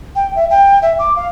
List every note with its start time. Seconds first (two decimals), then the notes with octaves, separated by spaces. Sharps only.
0.16 G5
0.36 E5
0.50 G5
0.82 E5
0.99 D6
1.16 F5